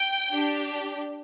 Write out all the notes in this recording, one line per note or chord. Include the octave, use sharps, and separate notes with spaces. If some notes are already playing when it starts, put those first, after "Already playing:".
Already playing: G5
D4 G4